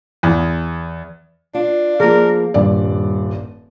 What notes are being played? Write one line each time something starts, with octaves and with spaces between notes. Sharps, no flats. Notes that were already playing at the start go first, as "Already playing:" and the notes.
E2
D4 F4
F3 A#3 G#4 A#4
D#1 G2 D5